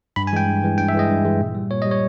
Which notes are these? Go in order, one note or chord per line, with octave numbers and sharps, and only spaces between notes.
G2 B5
G#5
E3 G#3 G5
G2
E3 G#3
G2 G5
E5
E3 G#3 D#5
G2
E3 G#3
A#2
G3
A#2 C#5
D#5
G3
C#5